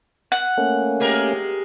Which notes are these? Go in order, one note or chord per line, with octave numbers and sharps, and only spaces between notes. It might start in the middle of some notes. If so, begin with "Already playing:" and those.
F#5
A3 A#3 C#4
G#3 G4 A#4